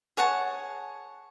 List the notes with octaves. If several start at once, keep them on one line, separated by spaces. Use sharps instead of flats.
G#4 C#5 F#5 A5